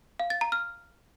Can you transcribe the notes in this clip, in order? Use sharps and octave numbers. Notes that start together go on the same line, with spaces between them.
F5
A6
A#5
F6